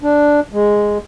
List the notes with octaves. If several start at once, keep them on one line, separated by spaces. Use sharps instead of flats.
D4
G#3